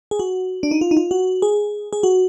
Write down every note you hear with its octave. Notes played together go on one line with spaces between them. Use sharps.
G#4
F#4
D4
D#4
F4
D#4
F4
F#4
G#4
G#4
F#4